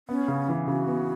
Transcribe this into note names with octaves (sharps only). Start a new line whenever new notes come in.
B3 C#4
C#3
E3
C#3 F#4
B3